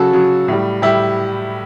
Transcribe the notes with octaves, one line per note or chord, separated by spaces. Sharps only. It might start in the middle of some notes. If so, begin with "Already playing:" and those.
Already playing: C#3 F#3 F#4 A4
C#3 F#3
A2 G3
A2 G3 E4 G4